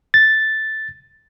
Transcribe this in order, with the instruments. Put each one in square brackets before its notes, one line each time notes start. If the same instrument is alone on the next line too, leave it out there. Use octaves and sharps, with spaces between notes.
[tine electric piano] A6